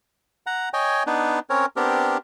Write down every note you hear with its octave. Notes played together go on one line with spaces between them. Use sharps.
F#5 A#5
C#5 D#5 G5 G#5
B3 D4 D#4 B4
C4 C#4 A#4 C#5
B3 C4 D4 G4 A#4